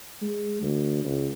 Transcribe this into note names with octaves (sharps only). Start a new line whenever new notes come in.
G#3
D2
C#2